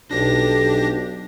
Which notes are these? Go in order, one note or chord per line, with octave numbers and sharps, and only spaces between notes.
B1 D4 G4 A#6